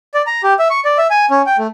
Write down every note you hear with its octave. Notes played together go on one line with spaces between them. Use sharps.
D5
A#5
G4
E5
C#6
D5
E5
G#5
C#4
G5
A3